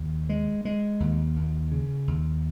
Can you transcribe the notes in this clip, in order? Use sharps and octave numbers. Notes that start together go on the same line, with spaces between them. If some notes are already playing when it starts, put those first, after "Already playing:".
Already playing: D#2
G#3
G#3
D#2
D#2
C#3
D#2